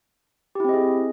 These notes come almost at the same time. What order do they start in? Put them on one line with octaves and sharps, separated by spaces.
G4 E4 C4 D#5 G#4